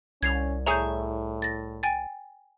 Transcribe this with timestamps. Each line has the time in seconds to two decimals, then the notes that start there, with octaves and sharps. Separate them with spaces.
0.23 C2 C#4 G#6 C7 F7
0.66 A2 G#4 C#5 E5 A#5 G6
1.42 A6 A#6
1.83 G5 G#5 A6